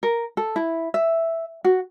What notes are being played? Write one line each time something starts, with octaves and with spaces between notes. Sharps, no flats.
A#4
A4
E4
E5
F#4